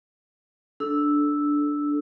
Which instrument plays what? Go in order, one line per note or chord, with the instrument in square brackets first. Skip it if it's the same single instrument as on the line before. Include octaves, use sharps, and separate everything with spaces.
[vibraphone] D4 A4 E6